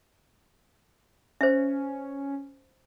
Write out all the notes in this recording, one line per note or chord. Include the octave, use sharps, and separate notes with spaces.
C#4 C5 E5